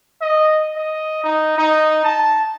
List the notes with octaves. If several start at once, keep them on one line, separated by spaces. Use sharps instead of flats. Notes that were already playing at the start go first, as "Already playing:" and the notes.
D#5
D#5
D#4
D#4
A5